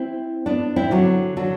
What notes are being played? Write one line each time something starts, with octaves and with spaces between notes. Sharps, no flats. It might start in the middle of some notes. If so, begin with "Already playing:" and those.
Already playing: C4 E4
B3 D4
C4 E4
D3 F#3
D3 F#3